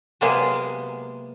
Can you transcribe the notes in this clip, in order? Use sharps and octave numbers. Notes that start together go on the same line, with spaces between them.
C3 F#3 G#3 A#3 B3 G#4